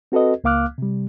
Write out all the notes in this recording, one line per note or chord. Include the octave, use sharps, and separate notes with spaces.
C4 F#4 A4 B4 D#5
C#2 A#3 F5 D6 F6 F#6
C3 G3